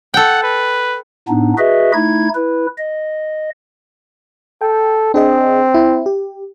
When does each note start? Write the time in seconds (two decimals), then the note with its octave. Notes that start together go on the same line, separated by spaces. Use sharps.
0.14 A4 F#5 G5
0.43 B4
1.29 A2 B3 D4 D#4
1.58 F#4 G#4 B4 D#5 E5
1.94 A3 D#4 E4 G#6
2.35 E4 B4
2.78 D#5
4.61 A4 G5
5.14 C4 D4 G#4 D#5
5.74 E4
6.06 G4